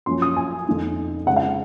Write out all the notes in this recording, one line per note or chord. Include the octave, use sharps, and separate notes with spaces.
F#2 F3 A#3 C#4 C6
D#6
G#5
F2 D#3 A#3
C#3 G#3 C4 F#5
F5